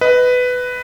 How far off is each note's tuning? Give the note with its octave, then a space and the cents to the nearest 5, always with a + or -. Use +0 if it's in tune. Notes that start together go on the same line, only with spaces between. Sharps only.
B4 +10 D#5 +5